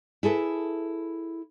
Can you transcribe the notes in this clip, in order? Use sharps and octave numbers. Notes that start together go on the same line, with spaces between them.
E4 G#4 A4 B4